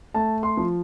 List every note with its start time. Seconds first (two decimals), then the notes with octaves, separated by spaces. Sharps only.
0.14 A3 A5
0.43 C6
0.57 F3